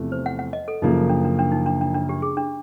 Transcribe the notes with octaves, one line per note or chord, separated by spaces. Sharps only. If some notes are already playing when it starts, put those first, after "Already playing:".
Already playing: E2 C3 F3 A3
C5
F#5
F#5
D#5
A4
F#2 C#3 F3 A#3 D#4
D4
D4
D4
D#4
D4
D4
D4
G4
G#4
D4